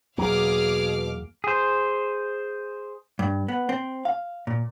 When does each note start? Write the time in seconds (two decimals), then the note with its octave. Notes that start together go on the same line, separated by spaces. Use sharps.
0.18 E2 B2 F#3 A#3 G#4 F5 D6 F6
1.44 G#4 C5
3.19 G2
3.48 B3
3.69 C4
4.05 F5
4.47 A#2